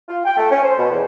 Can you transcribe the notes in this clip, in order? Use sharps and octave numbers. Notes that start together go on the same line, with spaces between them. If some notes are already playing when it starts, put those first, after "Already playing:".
F4
G5
A3
C#4
C5
B2
E2